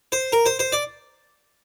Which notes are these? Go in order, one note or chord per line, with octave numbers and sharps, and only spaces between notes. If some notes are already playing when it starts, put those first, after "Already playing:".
C5
A#4
C5
C5
D5